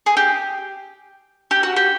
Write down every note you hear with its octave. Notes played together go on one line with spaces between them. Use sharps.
G#4
G4
G4
F#4
G4